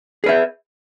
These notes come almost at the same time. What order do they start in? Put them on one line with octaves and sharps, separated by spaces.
G#4 B4 E5